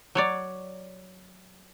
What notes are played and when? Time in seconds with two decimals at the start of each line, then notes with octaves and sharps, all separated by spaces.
0.15 F#3 C#5 D5